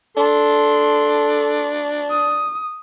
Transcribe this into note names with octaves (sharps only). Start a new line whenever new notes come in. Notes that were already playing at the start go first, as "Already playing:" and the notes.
D4 A4 C6
D#6